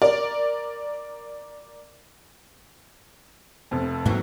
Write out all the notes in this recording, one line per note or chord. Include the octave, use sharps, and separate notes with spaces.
A#4 D5
F1 F2
D#2 G#2 E3 F#3 C4